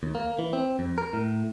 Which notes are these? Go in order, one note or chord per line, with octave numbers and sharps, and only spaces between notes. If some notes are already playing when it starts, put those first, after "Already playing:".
D#2
A#3
E3
C4
F2
A#4
A2